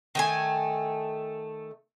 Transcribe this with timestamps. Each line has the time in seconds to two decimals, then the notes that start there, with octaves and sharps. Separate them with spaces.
0.15 D#3 A3 G#5